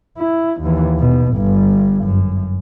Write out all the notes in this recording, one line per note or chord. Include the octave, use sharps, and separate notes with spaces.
E4
D#2 E3
D#2 B2
G1 G2
F#2